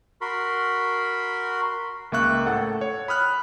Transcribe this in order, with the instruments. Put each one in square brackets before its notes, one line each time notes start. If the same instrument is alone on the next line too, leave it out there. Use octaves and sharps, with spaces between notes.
[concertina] F#4 A#4 B5 C6
[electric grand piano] C#2 A#3 E5 C#6 F#6
A2 A4 F#5
C#5
B5 D#6 F6 F#6